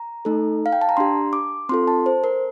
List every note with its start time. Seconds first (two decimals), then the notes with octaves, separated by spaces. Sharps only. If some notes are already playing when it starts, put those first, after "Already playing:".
Already playing: A#5
0.25 A3 D#4 A4
0.66 F5
0.72 G5
0.81 A5
0.89 A#5
0.97 D4 G4 C6
1.33 D6
1.69 C4 F4 A4 C6
1.88 A5
2.06 C5
2.24 A#4